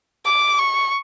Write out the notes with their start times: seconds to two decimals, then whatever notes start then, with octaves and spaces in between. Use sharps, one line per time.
0.25 D6
0.58 C#6